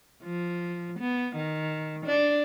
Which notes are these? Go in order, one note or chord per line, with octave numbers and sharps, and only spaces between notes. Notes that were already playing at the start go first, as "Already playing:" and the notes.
F3
B3
D#3
D4